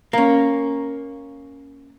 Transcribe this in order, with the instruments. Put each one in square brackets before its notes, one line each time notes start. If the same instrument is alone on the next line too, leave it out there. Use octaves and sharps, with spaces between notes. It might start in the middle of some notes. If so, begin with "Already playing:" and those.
[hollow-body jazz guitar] A#3 C#4